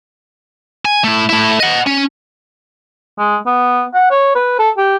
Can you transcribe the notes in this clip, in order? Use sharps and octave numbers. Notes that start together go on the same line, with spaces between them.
G#5
A3 E4
A3 E4
D#5 F#5
C#4
G#3
B3
F#5
C#5
B4
A4
G4